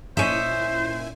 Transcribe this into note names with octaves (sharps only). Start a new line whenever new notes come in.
A#2 C#4 D#4 E4 C5 E5 G#5